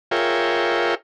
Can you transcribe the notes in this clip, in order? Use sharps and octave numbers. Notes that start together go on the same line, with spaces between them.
F4 G#4 A#4 C#5 E5 G5